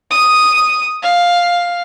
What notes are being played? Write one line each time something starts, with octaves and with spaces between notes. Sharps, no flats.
D#6
F5